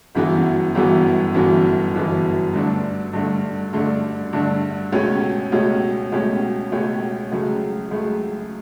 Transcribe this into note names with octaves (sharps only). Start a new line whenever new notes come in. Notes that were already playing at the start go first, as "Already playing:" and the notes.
G1 F#2 E3 B3 F#4
G1 F#2 E3 B3 F#4
G1 F#2 E3 B3 F#4
G1 F#2 E3 B3 F#4
G2 D3 A3 D4
G2 D3 A3 D4
G2 D3 A3 D4
G2 D3 A3 D4
C#2 B2 A3 C#4 G4
C#2 B2 A3 C#4 G4
C#2 B2 A3 C#4 G4
C#2 B2 A3 C#4 G4
C#2 C#3 F#3 A3
C#2 C#3 F#3 A3